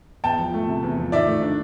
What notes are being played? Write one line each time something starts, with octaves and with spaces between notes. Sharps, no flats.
E2 G5 A5
F3
A3
C3
E2
F3
D#3 D5 E5
A3
D4